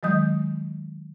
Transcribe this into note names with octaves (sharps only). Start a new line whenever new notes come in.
D#3 F#3 G#3 D#5 D#6 G6